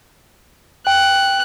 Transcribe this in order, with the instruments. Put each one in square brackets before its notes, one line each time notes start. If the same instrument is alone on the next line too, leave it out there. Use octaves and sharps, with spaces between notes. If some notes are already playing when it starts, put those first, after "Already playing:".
[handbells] G5 [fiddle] F#6